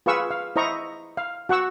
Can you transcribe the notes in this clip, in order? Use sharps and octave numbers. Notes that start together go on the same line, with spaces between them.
F4 G#4 B4 F5 C#6 E6
F5
E4 C5 D#5 A#5 C#6
F5
F#4 F#5 C#6 E6